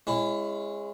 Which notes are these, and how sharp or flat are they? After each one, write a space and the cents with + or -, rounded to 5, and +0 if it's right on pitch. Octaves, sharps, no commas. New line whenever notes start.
G#3 -20 C#4 -20 E4 +20